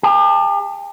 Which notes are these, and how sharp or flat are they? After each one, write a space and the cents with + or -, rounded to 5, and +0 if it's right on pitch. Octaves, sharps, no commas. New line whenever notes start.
G4 +40 A5 +10